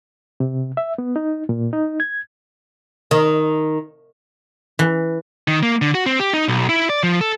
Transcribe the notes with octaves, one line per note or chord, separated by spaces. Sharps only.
C3
E5
B3
D#4
A#2
D#4
G#6
D#3
E3
D#3
A#3
D3
F#4
C4
G4
D#4
B1
E4
D5
F3
A4